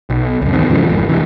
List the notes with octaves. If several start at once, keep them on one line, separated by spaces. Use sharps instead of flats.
B1
C#2 F#2
D1 E2 D#3 C4
G#2 C#3 E3 F3
G#1 F2
C3 E3